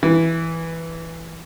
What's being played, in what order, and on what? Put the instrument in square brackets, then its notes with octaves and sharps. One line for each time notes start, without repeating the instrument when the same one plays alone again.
[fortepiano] E3